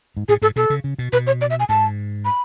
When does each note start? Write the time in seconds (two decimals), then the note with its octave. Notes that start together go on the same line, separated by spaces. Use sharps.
0.17 G#2
0.29 A2 G#4
0.42 G#2 A4
0.56 B2 A4
0.70 C#3
0.84 C#3
0.99 B2
1.13 B2 B4
1.27 C#5
1.41 D5
1.50 E5
1.59 G#5
1.69 G#2 A5
2.25 B5